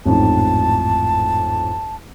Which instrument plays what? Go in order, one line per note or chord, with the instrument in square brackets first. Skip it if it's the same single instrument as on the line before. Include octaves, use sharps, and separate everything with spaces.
[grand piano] A1 F2 G#2 [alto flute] A5